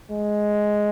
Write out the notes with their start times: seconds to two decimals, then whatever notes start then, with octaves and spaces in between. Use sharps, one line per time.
0.11 G#3